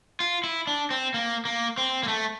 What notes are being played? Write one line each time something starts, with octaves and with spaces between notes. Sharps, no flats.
F4
E4
D4
C4
A#3
A#3
C4
A#3
A3